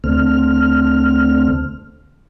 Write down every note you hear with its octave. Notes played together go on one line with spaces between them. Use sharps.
D2 D3 A3 C4 F6